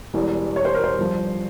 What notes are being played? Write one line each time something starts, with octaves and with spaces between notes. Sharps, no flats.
E1 E2 E3 G3
C#5
C5
A#4
C5
G1 G2 F3